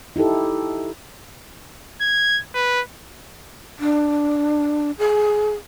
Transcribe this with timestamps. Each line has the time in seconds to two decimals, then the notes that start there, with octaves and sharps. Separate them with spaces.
0.16 D#4 E4 G4 A4
2.01 G#6
2.54 B4
3.80 D4
4.99 G#4